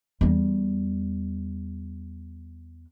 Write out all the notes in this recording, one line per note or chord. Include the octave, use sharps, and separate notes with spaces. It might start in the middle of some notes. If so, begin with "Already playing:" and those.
E2 G3